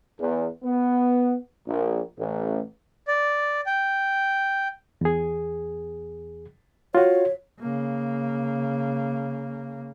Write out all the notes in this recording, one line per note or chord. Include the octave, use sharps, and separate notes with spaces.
E2
B3
A#1
A1
D5
G5
E2 G#4
F4 F#4 C#5
C#3 A#3